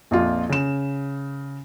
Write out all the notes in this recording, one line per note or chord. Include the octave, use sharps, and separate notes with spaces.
A#1 F2 F4
C#3 E7